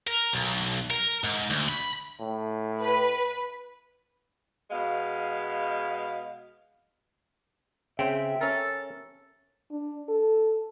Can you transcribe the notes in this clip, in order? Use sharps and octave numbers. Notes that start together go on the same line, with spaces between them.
A#4
B1
A#4
G#2
D2
B5
A2
B4
B2 G#3 F5
C#3 C4 E5 G5
C#4 A4 A#4
D4
A4